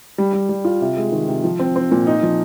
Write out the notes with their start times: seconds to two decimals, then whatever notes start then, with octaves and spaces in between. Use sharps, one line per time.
0.18 G3
0.33 G3
0.49 G3
0.65 F4
0.81 C3
0.97 G#3
1.12 D#3
1.28 C3
1.44 F3
1.59 C4
1.76 C4
1.91 A#2
2.07 D#4
2.23 F3